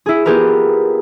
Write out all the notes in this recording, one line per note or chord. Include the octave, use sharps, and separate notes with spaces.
E4 G#4
B3 F4 G4 G#4 A#4 B4